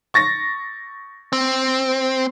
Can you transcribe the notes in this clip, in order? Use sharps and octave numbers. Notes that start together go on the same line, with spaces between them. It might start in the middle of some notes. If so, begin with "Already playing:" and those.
C#6 A6 A#6
C4